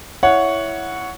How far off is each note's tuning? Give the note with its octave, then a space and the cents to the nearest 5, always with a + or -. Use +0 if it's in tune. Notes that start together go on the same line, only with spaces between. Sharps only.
E4 +0 C#5 +10 F#5 -10